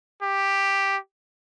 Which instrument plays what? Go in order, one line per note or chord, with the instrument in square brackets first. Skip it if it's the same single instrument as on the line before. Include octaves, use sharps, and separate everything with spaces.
[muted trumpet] G4